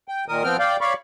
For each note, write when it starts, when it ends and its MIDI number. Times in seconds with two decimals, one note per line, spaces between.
0.08 0.25 79
0.28 0.43 46
0.28 0.43 51
0.28 0.43 70
0.28 0.43 87
0.43 0.57 53
0.43 0.57 59
0.43 0.57 60
0.43 0.57 79
0.43 0.57 89
0.59 0.77 74
0.59 0.77 77
0.59 0.77 79
0.81 0.94 73
0.81 0.94 74
0.81 0.94 77
0.81 0.94 83
0.81 0.94 85